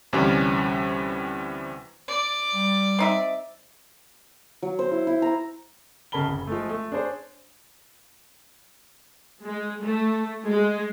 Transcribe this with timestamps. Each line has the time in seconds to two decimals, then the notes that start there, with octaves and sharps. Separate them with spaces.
0.13 D2 C3 E3 G3 C#4
2.08 D5
2.54 G3
2.99 C4 D#4 E5
4.63 F#3
4.79 C5
4.91 E4
5.07 E4
5.22 A#5
6.12 D1 C#3 A#4 A5 B5 G7
6.29 F#1
6.47 F3 G#3 A3
6.69 A3
6.92 D4 G#4 C5 C#5
9.44 G#3
9.82 A3
10.47 G#3